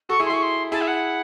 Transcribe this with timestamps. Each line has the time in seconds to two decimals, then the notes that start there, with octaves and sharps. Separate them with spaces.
0.09 F#4 A4 C#6
0.20 E4 G#4
0.25 C6
0.30 E4 G#4 C#6
0.42 C6
0.72 E4 G#4 A5
0.81 E5
0.87 F#5